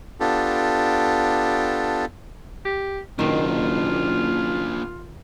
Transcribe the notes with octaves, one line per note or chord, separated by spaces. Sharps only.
B3 D4 F4 G4 A4
G4
F#1 B2 D#3 A#3 D4 F4